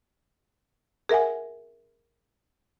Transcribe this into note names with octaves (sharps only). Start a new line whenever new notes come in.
G#4 A#4 E5 F#5 G#5